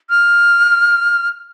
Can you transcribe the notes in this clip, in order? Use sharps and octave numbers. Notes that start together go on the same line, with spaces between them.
F6